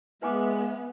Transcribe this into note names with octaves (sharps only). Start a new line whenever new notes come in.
G#3 B3 B4 E5 G#5 D6